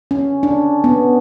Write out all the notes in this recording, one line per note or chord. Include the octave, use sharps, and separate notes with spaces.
C#4
D4
B3